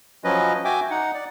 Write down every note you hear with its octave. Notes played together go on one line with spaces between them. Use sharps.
F3 F#3 C#4 B4 D#5
F#4 E5 G5 G#5 D6
D#4 F#5
D5